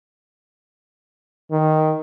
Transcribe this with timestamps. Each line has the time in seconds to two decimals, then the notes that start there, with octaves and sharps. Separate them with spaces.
1.51 D#3